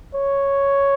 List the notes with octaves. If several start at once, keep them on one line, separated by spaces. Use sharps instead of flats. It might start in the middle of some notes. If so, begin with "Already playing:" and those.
C#5